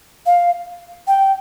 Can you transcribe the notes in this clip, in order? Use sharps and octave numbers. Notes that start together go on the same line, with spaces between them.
F5
G5